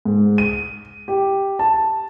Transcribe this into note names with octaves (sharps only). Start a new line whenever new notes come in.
G#2
D#7
G4
A5